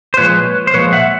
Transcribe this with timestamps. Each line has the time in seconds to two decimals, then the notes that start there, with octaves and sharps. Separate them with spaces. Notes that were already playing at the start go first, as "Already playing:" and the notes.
0.14 C5
0.17 A#2 F3 G#3 B4 C#5
0.67 C5
0.74 A#2 F3 G#3 B4 C#5
0.93 E5 F#5